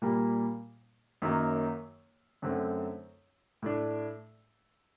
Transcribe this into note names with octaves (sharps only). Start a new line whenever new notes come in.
A#2 G3 A#3
F#2 D#3 F#3 A#3
F#2 D3 A3 C4
A2 A3 D4